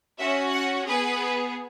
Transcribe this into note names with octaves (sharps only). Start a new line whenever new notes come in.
C#4 F#4 E5
F#5
B3 G#4 B4